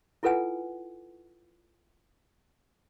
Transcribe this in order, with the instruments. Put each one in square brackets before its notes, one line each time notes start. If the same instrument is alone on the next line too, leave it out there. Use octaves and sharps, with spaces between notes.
[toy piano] E4 F4 A4 B4 F#5 G#5